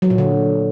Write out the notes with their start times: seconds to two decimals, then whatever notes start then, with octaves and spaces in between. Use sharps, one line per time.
0.02 F#3
0.10 A#2
0.18 D3